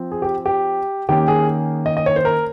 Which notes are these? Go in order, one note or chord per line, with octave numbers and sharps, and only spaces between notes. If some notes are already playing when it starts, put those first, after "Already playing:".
Already playing: F3 C4
G#4
G4
G4
D#3 A#3 C#4 G4
G#4
D#5
D#5
C#5
C5
A#4